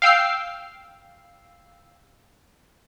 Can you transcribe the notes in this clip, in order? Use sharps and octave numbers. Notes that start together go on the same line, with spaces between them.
F5 G5 E6 C7